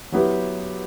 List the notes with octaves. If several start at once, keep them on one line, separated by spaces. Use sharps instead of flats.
F#3 B3 E4 G4 B4